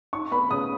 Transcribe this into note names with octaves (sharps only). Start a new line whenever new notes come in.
D#4 C#6
B3 B5
C#3 D#6